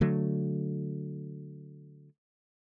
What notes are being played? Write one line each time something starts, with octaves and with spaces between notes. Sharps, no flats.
D3 F#3 A3